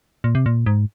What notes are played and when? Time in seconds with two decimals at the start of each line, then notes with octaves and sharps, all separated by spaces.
0.24 A#2
0.35 C3
0.46 A#2
0.66 G#2